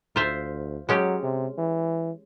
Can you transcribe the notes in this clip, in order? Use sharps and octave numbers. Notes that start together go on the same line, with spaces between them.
D2 F4 C5 E5
F#3 G#3 C#4 G4
C3
E3